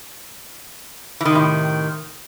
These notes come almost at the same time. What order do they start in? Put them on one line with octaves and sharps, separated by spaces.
E3 D#3 C3 A2